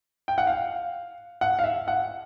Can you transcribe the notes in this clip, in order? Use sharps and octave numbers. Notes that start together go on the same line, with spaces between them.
G5
F#5
F5
F#5
F5
E5
F#5